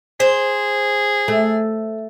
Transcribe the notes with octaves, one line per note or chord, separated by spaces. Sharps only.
G#4 C5
A3